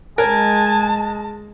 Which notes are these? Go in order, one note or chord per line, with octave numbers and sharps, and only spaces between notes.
G#3 A#4 G#5 A5